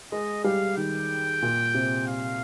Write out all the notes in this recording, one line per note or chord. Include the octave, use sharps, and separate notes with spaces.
G#3 D#5
G3 F5
D#3 G5
A#2
C3
F5